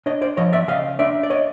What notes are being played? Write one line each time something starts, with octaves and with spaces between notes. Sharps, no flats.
D4 C#5 D#5
C5 D5
F3 C#5 D#5
D5 E5
C#3 D#5 F5
D4 D5 E5
D5
C#5 D#5